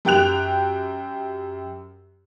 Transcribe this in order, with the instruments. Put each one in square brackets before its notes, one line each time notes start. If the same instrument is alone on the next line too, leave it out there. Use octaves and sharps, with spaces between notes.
[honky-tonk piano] F#2 G4 G5 F#6 F7